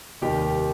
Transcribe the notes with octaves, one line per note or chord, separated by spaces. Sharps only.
F1 D#2 D#3 G3 G4